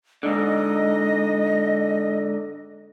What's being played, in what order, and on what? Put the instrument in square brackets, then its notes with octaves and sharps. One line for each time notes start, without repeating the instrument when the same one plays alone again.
[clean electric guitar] G#2 D3 [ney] D#5